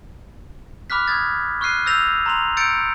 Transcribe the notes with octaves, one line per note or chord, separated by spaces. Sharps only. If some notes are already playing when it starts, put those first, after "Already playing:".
B5 D6 F6 F#6 B6
D#6 G#6 A6
C#6 F6 F#6 C7 D#7
E6 G6 A6 A#6 F7
A#5 C6 F7
E6 G6 A6 C#7 D7